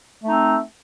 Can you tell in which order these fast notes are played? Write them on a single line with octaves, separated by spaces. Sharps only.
A3 D#4 C4